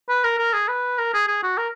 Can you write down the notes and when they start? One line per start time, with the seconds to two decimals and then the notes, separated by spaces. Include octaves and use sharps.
0.09 B4
0.24 A#4
0.38 A#4
0.53 G#4
0.68 B4
0.98 A#4
1.14 G#4
1.28 G#4
1.43 F#4
1.58 A#4